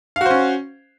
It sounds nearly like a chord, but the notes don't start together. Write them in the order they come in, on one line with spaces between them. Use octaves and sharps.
F5 F#4 C5 C#4